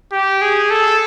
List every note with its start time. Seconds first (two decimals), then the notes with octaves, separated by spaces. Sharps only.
0.12 G4
0.42 G#4
0.70 A4